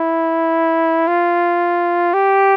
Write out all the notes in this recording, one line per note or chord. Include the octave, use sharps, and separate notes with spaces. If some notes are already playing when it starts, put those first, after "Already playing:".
Already playing: E4
F4
G4